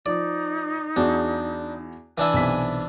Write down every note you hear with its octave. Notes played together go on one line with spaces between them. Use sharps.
F3 D#4 D5
E2 D4 F#4 G#4
E3 D4 E4 G#5
B1 C3 B6